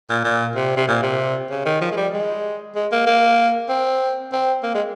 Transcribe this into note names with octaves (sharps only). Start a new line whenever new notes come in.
A#2
A#2
C3
C3
A#2
C3
C#3
D#3
F3
G#3
G3
G#3
G#3
A#3
A#3
C4
C4
A#3
G#3